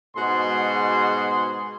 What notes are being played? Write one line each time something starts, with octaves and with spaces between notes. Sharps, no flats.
G#2 B2 F#4 G#4 C6